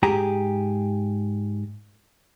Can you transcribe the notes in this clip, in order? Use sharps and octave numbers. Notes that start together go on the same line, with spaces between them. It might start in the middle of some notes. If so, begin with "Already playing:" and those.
G#2 G4 G#4 A#5